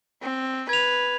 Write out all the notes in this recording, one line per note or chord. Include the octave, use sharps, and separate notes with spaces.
C4
B4 G#6 F7